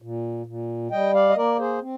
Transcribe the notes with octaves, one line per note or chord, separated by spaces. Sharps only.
A#2
A#2
G3 D#5 G5
D5 F5
D#5
A#3 A#4 D5
G#4 C5
C4